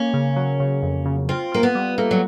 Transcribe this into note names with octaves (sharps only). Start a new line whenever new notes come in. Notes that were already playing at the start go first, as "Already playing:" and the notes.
Already playing: A#3 C#4
C#3
F#3
C#3
F2
C#3
C4 F4
A#3 F4
B3
G3
A3 A#3
F#3